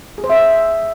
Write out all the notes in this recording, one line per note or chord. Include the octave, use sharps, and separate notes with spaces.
G#4
C5
E5